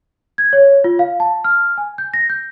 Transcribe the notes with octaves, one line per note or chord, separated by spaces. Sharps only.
G#6
C#5
F4
F5
A5
F6
G#5
G6
A#6
G6